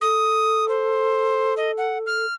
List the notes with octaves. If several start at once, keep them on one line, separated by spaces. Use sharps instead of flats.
A4 D#6
C5
D#5
F#5
F6